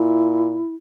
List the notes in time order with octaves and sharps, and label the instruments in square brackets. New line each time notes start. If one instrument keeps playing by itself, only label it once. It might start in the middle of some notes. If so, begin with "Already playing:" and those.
Already playing: [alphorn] A#2 [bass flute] E4